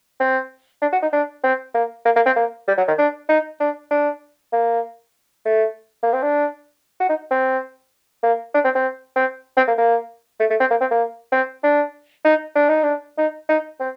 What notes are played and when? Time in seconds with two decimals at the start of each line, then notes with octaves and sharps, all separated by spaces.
0.20 C4
0.82 D4
0.92 F#4
1.02 D#4
1.13 D4
1.43 C4
1.75 A#3
2.05 A#3
2.16 A#3
2.26 C4
2.36 A#3
2.67 G3
2.77 F#3
2.88 D#3
2.98 D4
3.29 D#4
3.60 D4
3.91 D4
4.52 A#3
5.45 A3
6.03 A#3
6.13 C4
6.22 D4
7.00 F#4
7.09 D#4
7.31 C4
8.23 A#3
8.54 D4
8.64 C4
8.75 C4
9.16 C4
9.57 C4
9.68 A#3
9.78 A#3
10.40 A3
10.50 A3
10.60 C4
10.70 A#3
10.81 C4
10.91 A#3
11.32 C4
11.63 D4
12.25 D#4
12.55 D4
12.69 D#4
12.83 D4
13.18 D#4
13.49 D#4
13.80 C4